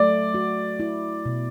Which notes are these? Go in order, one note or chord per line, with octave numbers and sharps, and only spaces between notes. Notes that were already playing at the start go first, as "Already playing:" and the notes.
Already playing: F#3 A3 D5
F#4
E4
B2